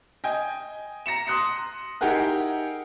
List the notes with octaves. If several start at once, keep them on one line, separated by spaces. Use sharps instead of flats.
D#5 G5 G#5
A#5 A#6 C#7 E7
C6 D#6 F#6 A#6 C#7
D#4 E4 G4 G#4 A#4 F#5